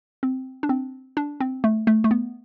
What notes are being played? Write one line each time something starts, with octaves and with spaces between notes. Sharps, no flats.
C4
D4
C4
D4
C4
A3
A3
A3
B3